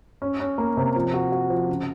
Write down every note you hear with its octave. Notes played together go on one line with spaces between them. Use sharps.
C#4
C#4
A#3
C3
F3
F#4
F#4
F3
C#3